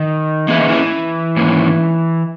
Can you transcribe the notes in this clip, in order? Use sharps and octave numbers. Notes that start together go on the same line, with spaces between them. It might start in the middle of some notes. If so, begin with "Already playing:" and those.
Already playing: D#3
E3 A#3 C#4 G#4 B4 E5
D#3
E3
G#2 D#3 A#3 C#4